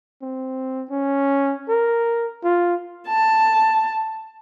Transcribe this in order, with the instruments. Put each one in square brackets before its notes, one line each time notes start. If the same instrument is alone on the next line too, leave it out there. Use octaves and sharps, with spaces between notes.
[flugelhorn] C4
C#4
A#4
F4
[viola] A5